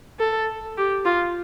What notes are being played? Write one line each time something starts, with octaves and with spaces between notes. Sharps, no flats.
A4
G4
F4